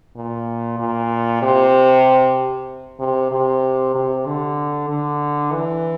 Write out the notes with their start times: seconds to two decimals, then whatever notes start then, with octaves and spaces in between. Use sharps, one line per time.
0.16 A#2
0.79 A#2
1.42 C3
3.00 C3
3.32 C3
3.95 C3
4.26 D3
4.89 D3
5.53 E3